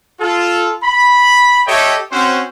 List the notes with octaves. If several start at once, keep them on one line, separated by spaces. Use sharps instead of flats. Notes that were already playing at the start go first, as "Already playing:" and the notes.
F4 A4
B5
G4 A4 C#5 D#5 E5 G5
C4 C#4 F#4 C5